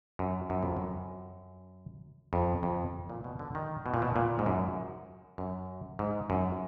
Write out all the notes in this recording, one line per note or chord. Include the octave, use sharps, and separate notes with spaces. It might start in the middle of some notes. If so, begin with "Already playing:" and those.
F#2
F#2
F2
F#2
F2
F2
A#2
B2
D3
D#3
B2
A#2
B2
A#2
G#2
F#2
F#2
G#2
F#2